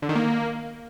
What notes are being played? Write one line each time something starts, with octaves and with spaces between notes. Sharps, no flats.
D3
D#3
A#3